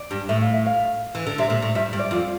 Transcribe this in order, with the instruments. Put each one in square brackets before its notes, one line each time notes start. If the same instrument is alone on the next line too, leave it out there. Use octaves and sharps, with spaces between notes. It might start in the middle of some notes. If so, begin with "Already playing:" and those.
Already playing: [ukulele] D5
[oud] G2
[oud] A2 [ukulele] E5
[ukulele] F5
E5
F5
[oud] E3
D3
[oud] C3 [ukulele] E5
[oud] A#2
A2
[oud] G2 [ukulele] E5
[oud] G2
[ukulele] D5
[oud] F2 [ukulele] F4